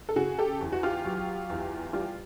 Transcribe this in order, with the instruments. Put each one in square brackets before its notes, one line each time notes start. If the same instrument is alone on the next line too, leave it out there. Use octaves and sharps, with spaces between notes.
[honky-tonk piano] A4
C#3 F#4 G#4
G4 A4
E2
F#4
F4 G4
F#3
E2
G3 F4 G4